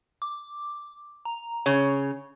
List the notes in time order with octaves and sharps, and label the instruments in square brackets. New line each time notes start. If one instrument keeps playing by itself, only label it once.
[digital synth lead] D6
A#5
[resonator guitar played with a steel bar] C#3 [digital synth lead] C#5